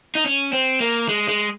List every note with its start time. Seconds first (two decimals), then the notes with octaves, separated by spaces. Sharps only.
0.15 D#4
0.26 C#4
0.53 C4
0.80 A#3
1.08 G#3
1.29 G#3